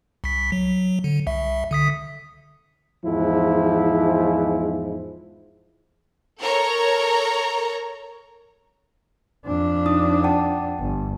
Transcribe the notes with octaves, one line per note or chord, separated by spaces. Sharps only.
C2 B6
F#3
D3
C2 E5
D3 D#6 B6
E2 G#2 F3 E4
A4 A#4 C#5 A#5
F2 D4
D#4 D#6
F#5 G5 A5
G1